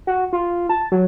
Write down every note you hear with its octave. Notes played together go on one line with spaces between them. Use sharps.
F#4
F4
A5
F#3